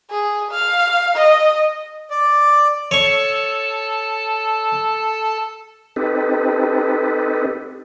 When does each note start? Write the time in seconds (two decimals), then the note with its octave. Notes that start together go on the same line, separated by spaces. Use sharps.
0.10 G#4
0.51 F5
1.16 D#5
2.10 D5
2.91 A4 C#5 A5 C#6
5.96 C4 D#4 G4 A4 B4